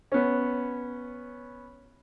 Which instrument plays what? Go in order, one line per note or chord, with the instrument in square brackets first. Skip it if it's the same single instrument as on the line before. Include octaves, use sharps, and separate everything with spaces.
[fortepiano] B3 C#4